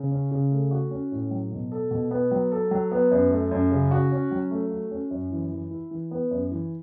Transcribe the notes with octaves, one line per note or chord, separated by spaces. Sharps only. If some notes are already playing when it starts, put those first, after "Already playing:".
Already playing: C#3
C#4
C#3
A3
F#4
C#4
A2
F#3
B2
A4
B2
B3
F#3
A4
F#3
B3
F#2
A3
F#2
C#3
F#4
C#4
F#3
A3
F#4
C#4
F#2
E3
E3
E4
E3
B3
F#2
E3